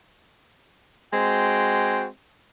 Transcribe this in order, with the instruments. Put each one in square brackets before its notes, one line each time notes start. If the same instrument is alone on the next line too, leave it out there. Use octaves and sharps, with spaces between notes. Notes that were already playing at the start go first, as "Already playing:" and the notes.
[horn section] G#3 C4 F#4 G5